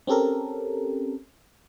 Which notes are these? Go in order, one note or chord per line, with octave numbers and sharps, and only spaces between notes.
C4 C#4 G4 A4 A#4